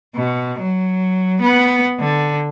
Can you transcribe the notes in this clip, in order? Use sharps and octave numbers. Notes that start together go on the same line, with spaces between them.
B2
F#3
B3
D3